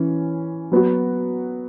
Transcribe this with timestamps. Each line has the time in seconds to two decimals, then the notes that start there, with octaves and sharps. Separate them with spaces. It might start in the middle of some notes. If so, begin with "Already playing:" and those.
Already playing: E3 C#4
0.72 F#3 B3 F#4